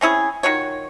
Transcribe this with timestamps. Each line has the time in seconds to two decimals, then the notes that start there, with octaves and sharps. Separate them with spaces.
0.01 C4 C#4 E4 G#4
0.43 D#3 F4 F#4 C#5